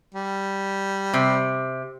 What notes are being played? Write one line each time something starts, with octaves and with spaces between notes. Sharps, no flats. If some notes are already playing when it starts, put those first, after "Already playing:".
G3
C3